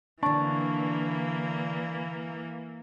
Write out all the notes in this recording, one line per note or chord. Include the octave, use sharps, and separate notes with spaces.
D3 E3 A#3 D4 A5 C#6